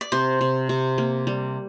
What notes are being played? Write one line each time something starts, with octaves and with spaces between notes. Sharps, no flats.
D5
C3 C5
C3
C3
A#3
G3